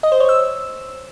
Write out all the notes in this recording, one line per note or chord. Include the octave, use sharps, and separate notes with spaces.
D#5
C5
C#5
E6